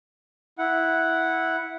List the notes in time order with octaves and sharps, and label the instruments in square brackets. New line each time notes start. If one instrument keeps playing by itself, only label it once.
[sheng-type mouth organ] E4 F#5